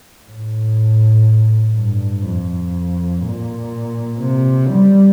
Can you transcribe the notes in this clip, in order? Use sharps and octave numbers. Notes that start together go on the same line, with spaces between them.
A2
G2
F2
A#2
C3
G3